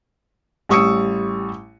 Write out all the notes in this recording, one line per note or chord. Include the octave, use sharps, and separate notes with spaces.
A1 G3 C#6 D#6 E6 C#7